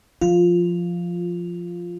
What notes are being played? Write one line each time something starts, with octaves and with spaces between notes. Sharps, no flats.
F3 F4